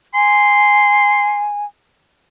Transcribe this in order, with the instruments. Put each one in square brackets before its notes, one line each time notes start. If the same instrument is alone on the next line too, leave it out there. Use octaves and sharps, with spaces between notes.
[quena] G#5 [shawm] C6